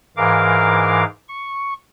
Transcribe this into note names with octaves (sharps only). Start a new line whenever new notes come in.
G#2 E3 A#4 F5 D6
C#6